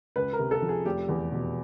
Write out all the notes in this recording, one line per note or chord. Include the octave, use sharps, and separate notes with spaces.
C#2 B4
A#4
C3
A4
F3
G#4
F1 G4
E2
B2